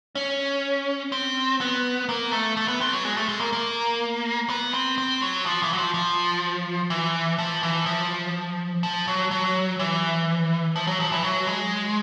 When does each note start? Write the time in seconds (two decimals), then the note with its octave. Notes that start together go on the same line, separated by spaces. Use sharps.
0.15 C#4
1.12 C4
1.61 B3
2.09 A#3
2.33 A3
2.57 A3
2.68 B3
2.81 C4
2.92 F#3
3.05 G#3
3.17 A3
3.29 G#3
3.40 A#3
3.53 A#3
4.49 B3
4.74 C4
4.98 C4
5.22 F#3
5.46 F3
5.62 E3
5.73 F#3
5.78 F3
5.94 F3
6.90 E3
7.38 F3
7.63 E3
7.86 F3
8.83 F3
9.08 F#3
9.31 F#3
9.79 E3
10.76 F3
10.87 F#3
11.00 F3
11.12 E3
11.24 F#3
11.47 G#3